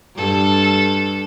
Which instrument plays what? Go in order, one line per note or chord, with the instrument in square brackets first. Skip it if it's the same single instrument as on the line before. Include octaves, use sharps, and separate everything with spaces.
[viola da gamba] G2 A4